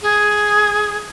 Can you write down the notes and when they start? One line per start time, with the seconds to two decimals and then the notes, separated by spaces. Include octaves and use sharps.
0.02 G#4